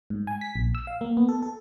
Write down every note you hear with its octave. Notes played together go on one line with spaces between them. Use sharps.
G#2
G#5
B6
A#1
E6
F5
A#3
B3
A4
A4